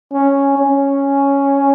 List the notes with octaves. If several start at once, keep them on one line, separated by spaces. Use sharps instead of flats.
C#4
C#4